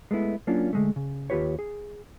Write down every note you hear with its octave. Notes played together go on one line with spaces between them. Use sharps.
G#3 A3 B3 E4
F#3 A#3 C#4 D4 F4
D3 G#3 A3
C#3
D#2 F4 G4 B4 C#5
G#4